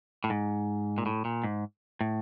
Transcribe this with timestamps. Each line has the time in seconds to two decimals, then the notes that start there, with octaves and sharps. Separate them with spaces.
0.24 A2
0.30 G#2
0.98 A#2
1.06 A2
1.25 A#2
1.44 G#2
2.01 A2